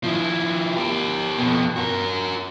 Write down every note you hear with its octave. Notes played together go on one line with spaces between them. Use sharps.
F3 E4
G4 A#4
F2 B2
F#4 A#4